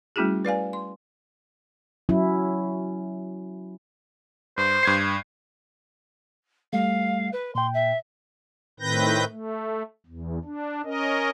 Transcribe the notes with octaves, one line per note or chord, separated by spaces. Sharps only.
G3 A3 C#4 E4 F#4 G#4
B4 D5 F5 G#5
C6
F#3 C#4 E4
G2 C5
G2 G#6 C7
G3 A3 F5
B4
A#2 G5 C6
E5
A2 D#3 C4 B4 G6 A#6
A3
E2
D4
C#4 A#4 D#5